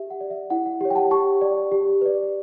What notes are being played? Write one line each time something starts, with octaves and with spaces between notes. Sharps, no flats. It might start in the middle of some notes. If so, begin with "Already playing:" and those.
Already playing: G4 E5
F#5
D5
E5
E4 F#5
F#5
G4 C#5
G5
F#5 A5
G4 A5 C#6
D5
G4
B4 D5